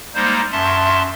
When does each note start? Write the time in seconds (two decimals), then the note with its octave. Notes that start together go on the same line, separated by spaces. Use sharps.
0.15 G3 G#3 A#3 D#4 C5
0.52 F#2 E5 A5 C6